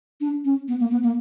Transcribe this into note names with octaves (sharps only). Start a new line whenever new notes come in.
D4
C#4
B3
A#3
B3
A#3